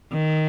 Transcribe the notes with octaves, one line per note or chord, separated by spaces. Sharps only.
D#3